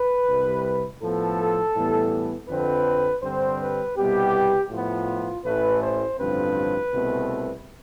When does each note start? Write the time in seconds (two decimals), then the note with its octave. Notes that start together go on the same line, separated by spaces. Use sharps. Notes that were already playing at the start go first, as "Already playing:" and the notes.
Already playing: B4
0.28 C2 C3 G3
1.00 A2 F3 B3 A4
1.75 A2 E3 G3 B3
2.48 F2 D3 F3 C4 B4
3.22 G2 D3 G3 C4 C5
3.59 B4
3.96 C2 B2 G3 B3 G4
4.71 A2 F3 B3 F4
5.44 A1 A2 E3 A3 B4
5.81 C5
6.18 A1 G2 D3 F3 C4 B4
6.92 C2 B2 A3 C4